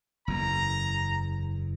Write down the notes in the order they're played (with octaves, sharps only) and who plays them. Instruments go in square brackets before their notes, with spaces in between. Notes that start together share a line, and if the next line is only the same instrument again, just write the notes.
[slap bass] F#1 E2 [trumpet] A#5